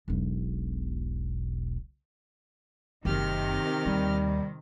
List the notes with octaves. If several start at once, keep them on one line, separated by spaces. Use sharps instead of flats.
E1 B1
F#1 F#2 C3 D#3 G4 F6
D#2 G3